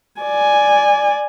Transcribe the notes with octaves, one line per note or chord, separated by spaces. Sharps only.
D5 G#5